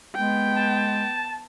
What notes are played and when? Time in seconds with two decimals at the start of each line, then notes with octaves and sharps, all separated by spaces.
0.16 G#3 B3 G5
0.56 A5